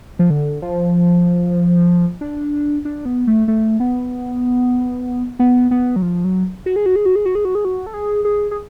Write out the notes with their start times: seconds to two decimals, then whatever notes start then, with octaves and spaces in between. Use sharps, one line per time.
0.19 F3
0.30 D3
0.62 F3
2.21 D4
2.85 D4
3.05 B3
3.27 A3
3.48 A3
3.80 B3
5.39 B3
5.71 B3
5.96 F#3
6.02 F3
6.24 F#3
6.66 F#4
6.76 G#4
6.86 F#4
6.96 G#4
7.05 F#4
7.16 G#4
7.25 F#4
7.35 G#4
7.45 F#4
7.55 G#4
7.65 F#4
7.86 A4
7.94 G#4
8.25 G#4
8.51 G#4